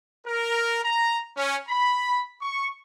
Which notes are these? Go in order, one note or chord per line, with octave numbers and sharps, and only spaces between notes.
A#4
A#5
C#4
B5
C#6